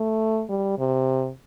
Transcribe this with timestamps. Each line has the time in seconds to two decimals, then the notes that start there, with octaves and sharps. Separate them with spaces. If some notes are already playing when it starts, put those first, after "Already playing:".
Already playing: A3
0.49 G3
0.78 C3